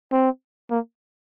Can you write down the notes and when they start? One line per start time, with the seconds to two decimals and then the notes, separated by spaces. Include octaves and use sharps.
0.12 C4
0.71 A#3